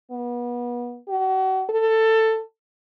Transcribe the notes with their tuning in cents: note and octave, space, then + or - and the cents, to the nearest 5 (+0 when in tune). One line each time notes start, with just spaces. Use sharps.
B3 -30
F#4 +35
A4 +15